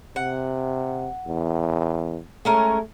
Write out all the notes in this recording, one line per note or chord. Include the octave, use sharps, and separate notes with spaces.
C3 F#5
E2
G#3 A3 C#4 A#4